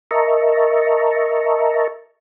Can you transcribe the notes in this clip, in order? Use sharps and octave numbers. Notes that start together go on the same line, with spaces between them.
A#4 D#5 E5 A5 A#5 C#6